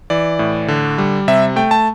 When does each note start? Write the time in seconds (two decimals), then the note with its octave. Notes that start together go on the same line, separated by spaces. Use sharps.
0.10 E3 D5
0.39 A2
0.68 D3
0.98 G3
1.28 C3 E5
1.56 A3 G5
1.71 A5